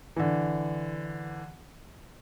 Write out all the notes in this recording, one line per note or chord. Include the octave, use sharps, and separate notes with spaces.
D3 E3